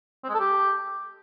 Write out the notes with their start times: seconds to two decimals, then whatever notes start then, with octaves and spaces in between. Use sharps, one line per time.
0.23 C4
0.29 G#3
0.34 A4
0.40 G4